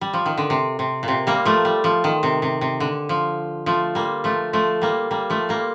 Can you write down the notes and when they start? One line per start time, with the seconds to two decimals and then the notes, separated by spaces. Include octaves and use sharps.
0.01 G3
0.13 F3
0.26 D#3
0.37 D3
0.50 C3
0.79 C3
1.03 A#2
1.08 C3
1.27 G3 A#3
1.45 F3 A3
1.65 G3
1.84 F3
2.04 D#3
2.23 C3
2.42 C3
2.61 C3
2.80 D3
3.09 F3
3.66 F3 A3
3.95 G3 A#3
4.24 F3 A3
4.53 F3 A3
4.82 G3 A#3
5.11 G3 A#3
5.30 F3 A3
5.49 G3 A#3